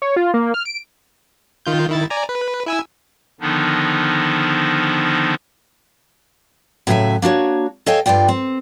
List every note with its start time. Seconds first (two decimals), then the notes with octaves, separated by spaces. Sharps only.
0.02 C#5
0.16 F4
0.34 A#3
0.54 F6
0.65 D7
1.66 D#3 F4 G6
1.89 D#3 E4 A6
2.10 D5 G#5 A#5
2.29 B4
2.66 E4 G#5 E6
3.41 D3 D#3 F3 B3 D4 D#4
6.87 A2 C#3 F#3 A4 E5 G#5
7.22 A#3 D4 F#4 C#5
7.86 A4 C#5 D#5 F5 G5 G#5
8.06 G2 D#3 F4 D5 G5
8.29 C4